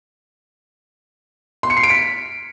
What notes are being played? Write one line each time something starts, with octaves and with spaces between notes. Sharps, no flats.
C6
C#7
C7
D7
B6